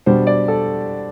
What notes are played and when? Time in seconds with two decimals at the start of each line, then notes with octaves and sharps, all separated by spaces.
0.06 B2 G3 D4 C5
0.27 D5
0.48 A4